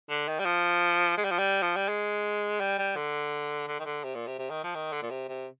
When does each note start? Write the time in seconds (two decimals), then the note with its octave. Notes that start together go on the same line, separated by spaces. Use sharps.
0.10 D3
0.28 D#3
0.39 G3
0.45 F3
1.17 G#3
1.24 G3
1.31 F3
1.38 G3
1.62 F3
1.76 G3
1.88 G#3
2.60 G3
2.78 G3
2.96 D3
3.68 D3
3.79 D#3
3.85 D3
4.04 C3
4.15 A#2
4.27 C3
4.39 C3
4.50 D#3
4.63 F3
4.75 D#3
4.92 D3
5.02 A#2
5.10 C3
5.29 C3